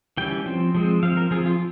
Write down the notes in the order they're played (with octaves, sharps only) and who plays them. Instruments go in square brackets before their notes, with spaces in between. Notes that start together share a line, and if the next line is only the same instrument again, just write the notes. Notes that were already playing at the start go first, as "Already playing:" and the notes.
[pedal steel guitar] E3 G3 C#4 G5
F3 C4
F3 G#3 C4
F3 C4 F5
A#4
F3 C4 G#4
F4